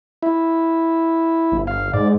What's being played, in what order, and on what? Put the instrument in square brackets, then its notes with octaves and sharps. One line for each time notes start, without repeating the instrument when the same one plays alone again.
[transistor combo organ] E4
[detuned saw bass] G1
[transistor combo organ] F5
[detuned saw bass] G#2 [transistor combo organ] D5